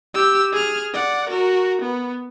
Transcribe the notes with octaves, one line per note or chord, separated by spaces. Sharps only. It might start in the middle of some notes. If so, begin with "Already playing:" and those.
G4 E6
G#4 F6
D5 F#5
F#4 A#4
B3